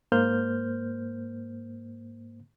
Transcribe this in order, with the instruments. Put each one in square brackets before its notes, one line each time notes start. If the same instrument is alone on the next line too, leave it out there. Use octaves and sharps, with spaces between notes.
[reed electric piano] G#2 A#3 C5 F6 G6